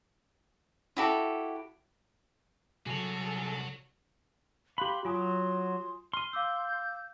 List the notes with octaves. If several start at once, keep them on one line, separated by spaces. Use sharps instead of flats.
E4 F#4 G4 A4
C2 F#3 F#4 G#4 A4 C#5
G4 F5 B5 C6 F#6
F#3 F4 G#5 C6 D#6
C6 F6 D#7
F5 D6 E6 G6